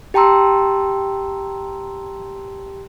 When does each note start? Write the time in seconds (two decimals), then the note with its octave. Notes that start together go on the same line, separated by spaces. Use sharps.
0.14 G4 G5 A5 A#5 C6 E6